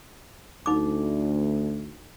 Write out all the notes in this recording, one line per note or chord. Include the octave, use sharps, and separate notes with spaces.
D2 D#4 D6